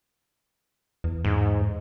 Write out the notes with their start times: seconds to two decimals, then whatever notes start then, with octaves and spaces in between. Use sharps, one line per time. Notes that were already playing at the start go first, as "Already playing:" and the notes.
1.04 E2
1.25 G#2